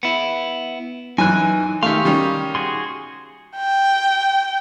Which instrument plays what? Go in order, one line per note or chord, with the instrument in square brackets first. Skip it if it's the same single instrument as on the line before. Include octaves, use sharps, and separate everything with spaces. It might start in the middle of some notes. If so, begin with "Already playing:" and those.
[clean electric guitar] B3 E4
[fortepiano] F#2 E3 [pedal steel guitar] D#4 F#6 [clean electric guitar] G#5
[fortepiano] D#3 A3 [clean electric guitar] G4 F5 [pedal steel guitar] C6 C#6
[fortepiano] D#3 G3 C#4
[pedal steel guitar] F#4 G#4 C6
[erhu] G5